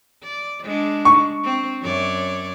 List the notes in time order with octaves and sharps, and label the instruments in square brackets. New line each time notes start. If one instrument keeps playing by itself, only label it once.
[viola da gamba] D5
G#3 D4
[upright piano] C#6
[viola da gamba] C4
F#2 C#5 D5